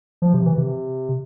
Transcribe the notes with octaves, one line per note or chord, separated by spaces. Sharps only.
F3
C3
E3
C3